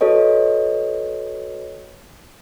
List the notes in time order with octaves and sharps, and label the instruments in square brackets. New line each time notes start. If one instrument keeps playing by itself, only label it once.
[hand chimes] F#4 A4 B4 C#5 D#5